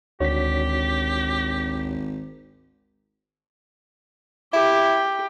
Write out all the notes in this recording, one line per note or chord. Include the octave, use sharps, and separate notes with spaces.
G#1 D2 D4 F#4 G4 C#5 B6
E4 G4